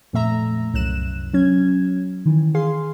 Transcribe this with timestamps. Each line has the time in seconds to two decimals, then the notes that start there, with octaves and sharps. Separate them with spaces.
0.13 F2 A#2 A3 E5 A#5
0.74 C2 F#2 F#6 E7
1.33 F#3 C#4 G#6
2.26 D#3 E3
2.55 G#4 F5 C6